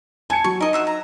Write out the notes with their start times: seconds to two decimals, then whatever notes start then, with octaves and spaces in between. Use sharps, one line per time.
0.30 G#5 A5 G#6 C#7
0.44 F#3 C#6
0.61 D#4 A#4 D#5
0.73 C5 E5 F#5
0.87 A#5